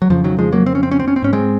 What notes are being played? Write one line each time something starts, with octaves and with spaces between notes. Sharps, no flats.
F#3
F2 C#3 F3
D#3 F#3
F3 G#3
F#3 A#3
C4
C#4
C4
C#4
C4
C#4
C4
G#2 C#4
G#3 C4